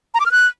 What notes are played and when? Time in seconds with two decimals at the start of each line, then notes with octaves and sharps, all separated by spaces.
0.14 A#5
0.20 D6
0.26 F6
0.31 F#6